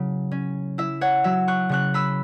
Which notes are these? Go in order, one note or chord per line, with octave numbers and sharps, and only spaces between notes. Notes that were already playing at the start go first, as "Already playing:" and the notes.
Already playing: C#3 F#3 E4
C#4
E4 E5
C#5 F#5
F#3 E5
C#6 F#6
C#3 C#6 F#6
B5 E6